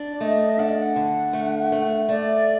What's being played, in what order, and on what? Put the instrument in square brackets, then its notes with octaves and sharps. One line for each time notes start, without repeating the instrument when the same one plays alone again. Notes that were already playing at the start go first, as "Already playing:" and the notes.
Already playing: [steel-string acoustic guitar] D4
[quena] D5
[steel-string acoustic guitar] A3 [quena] D#5
[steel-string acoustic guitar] D4 [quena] F#5
[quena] D#5
F#5
[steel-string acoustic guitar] D3
A3
A3
[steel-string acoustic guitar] A3 [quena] D5